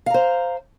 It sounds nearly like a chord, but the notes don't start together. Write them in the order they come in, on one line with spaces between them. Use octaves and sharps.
F5 A#5 C5